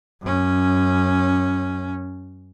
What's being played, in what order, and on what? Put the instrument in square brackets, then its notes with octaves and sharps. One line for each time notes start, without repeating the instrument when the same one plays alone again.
[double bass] F#2 C#4